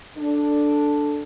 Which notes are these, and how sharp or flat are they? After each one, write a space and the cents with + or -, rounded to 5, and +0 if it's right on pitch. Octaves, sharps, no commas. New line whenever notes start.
D4 +0 A4 +0